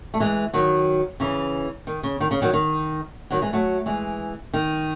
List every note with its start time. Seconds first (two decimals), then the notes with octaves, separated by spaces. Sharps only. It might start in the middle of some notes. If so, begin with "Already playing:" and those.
0.14 A3
0.20 E3 G#3
0.54 D#3 F#3
1.20 C#3 E3
1.87 D#3
2.03 C#3
2.20 D#3
2.31 C#3
2.42 D#3 F#3
2.53 D#3
3.31 D#3 F#3
3.42 E3 G#3
3.53 F#3 A3
3.86 E3 G#3
4.53 D#3